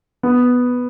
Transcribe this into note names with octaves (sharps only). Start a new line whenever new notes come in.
B3